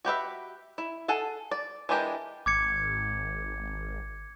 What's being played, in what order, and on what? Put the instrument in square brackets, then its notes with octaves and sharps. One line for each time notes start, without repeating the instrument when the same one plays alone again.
[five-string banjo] F#4 G4 B4 E5
E4
G#4 A4 F#5
D5
E3 G#3 D4 G4 A#4
[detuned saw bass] G#1 [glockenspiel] D6 G#6 C#7